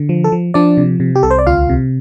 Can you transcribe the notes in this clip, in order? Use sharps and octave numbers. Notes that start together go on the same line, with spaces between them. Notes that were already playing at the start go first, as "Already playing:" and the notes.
Already playing: D3
F3
A4
F3
F3 D4 D5
C3
C3
G4
C2 A4
C5
D5
D2 F4 F5
C3